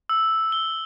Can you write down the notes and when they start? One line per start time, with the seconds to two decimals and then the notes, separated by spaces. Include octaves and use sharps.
0.09 E6
0.52 G7